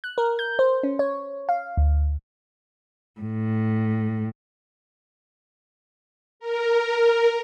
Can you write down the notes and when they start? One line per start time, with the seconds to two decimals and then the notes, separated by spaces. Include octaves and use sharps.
0.04 F#6
0.18 A#4
0.39 G6
0.59 C5
0.83 C#4
0.99 C#5
1.49 F5
1.77 D2
3.21 A2
6.40 A#4